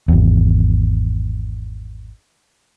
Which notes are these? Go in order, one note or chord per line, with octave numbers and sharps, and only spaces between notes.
G#1 E2